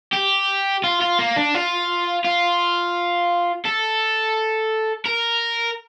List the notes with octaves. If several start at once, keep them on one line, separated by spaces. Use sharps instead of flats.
G4
F4
F4
A#3
D4
F4
F4
A4
A#4